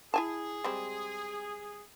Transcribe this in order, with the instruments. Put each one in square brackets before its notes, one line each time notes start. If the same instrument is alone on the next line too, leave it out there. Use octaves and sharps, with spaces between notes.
[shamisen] E4 G#5 A5 [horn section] G#4
[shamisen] G3 G#3 C4